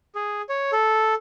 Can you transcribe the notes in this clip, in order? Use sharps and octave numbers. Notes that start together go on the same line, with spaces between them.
G#4
C#5
A4